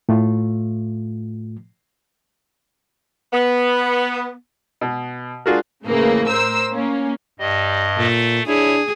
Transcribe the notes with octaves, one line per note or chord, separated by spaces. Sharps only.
A2 A3 F4
B3
B2
D4 F4 F#4 G#4 A#4
A2 C#3 E3 A#3
A#4 C5 E6
A#3 C#4
G2 G3 D#5
A#2 A3
D4 E4 G#4 C#5